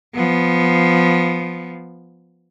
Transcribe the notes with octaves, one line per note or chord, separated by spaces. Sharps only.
F3 B3